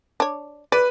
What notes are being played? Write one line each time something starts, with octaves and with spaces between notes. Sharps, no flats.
D4 C#5
B4 D5